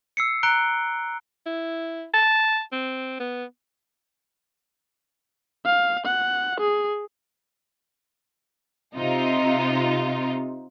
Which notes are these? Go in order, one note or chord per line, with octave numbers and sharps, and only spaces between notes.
E6 C7 C#7
A#5 F#6 C#7 D7 G7
E4
A5
C4
B3
F5
F#5
G#4
C3 D#4 F4